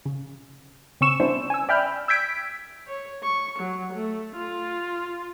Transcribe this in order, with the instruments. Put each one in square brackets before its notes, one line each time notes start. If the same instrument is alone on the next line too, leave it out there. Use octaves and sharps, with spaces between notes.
[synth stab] C#3
C#3 C4 C#4 C#6 E6 E7
G3 B3 C#4 D4 E4 C5
G#5 E6
D5 E5 G5 B5 F6 G6
E6 G6 G#6 B6 D7
[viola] C#5
C#6
F#3
A3
F4